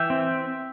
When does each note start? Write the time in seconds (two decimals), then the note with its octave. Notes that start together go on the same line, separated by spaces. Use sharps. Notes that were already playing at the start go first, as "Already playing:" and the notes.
Already playing: E3 E5 G5
0.10 C4